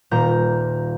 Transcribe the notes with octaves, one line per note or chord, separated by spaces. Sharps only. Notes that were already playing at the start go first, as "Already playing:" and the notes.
D#1 A#2 A#3 A#5 G6